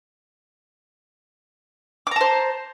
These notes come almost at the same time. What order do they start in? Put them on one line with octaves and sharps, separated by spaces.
D6 A#5 A5 C5